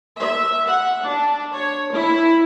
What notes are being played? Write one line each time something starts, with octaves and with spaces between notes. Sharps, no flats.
E5
F#5
D4
C#5
E4